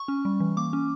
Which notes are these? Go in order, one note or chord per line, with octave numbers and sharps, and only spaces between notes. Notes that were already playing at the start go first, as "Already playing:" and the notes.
Already playing: C#6
C#4
G3
E3
A#3 D6
C#4